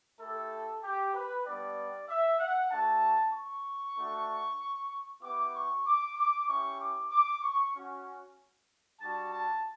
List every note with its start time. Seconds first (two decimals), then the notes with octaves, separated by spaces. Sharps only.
0.19 A3 E4 G4 A4
0.83 G4
1.14 B4
1.45 G3 B3 D4 G4 D5
2.08 E5
2.39 F#5
2.71 A3 D4 F#4 A5
3.33 C#6
3.97 A3 D4 F#4
5.22 B3 E4 G4 D6
5.53 C#6
5.86 D6
6.17 D6
6.48 C#4 E4 G4 C#6
6.79 D6
7.11 D6
7.42 C#6
7.75 C#4 F#4
9.00 G3 D4 F#4 A5
9.31 A5